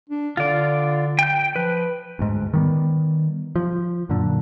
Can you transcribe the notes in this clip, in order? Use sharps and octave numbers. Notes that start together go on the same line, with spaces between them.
D4
D3 F4 D5
G5 G6
F3 B4
D2 G#2
D#3 G3 B3
F3
F#2 A#2 D3